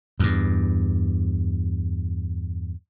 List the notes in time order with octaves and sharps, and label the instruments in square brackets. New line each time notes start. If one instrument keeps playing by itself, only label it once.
[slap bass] E2 G2